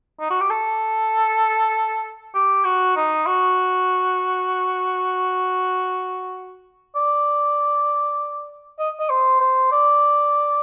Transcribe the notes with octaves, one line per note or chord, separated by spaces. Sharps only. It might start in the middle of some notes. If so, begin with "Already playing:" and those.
D#4
F#4
G4
A4
G4
F#4
D#4
F#4
D5
D#5
D#5
C5
C5
D5